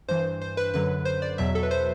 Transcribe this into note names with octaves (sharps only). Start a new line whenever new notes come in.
G2 E3 C5
C5
B4
F#2 D3 F#3 B4
C5
D5
E2 B2 F#3 E5
A4
B4
C5